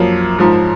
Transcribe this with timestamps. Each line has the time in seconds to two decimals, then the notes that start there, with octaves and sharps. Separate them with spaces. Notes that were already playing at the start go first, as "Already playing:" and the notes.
Already playing: F#2 F3 A#3
0.39 G#2 F3